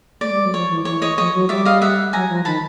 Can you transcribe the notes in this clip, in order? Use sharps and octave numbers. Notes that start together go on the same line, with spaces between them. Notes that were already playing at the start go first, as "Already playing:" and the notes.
A3 D5
G3
F#3
F3 C#5
E3
E3 C#5
C#5 D#5
F3 C#5 D#5
F#3
G3 D5 E5
D#5 F5
E5 F#5
F#3 G#5 A#5
F3
D#3 A5 B5